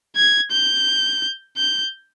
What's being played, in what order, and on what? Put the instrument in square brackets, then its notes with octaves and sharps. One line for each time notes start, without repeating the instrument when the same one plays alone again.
[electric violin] G#6
G6
G6